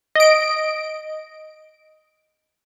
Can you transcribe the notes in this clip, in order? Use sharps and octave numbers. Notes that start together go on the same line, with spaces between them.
D#5 D7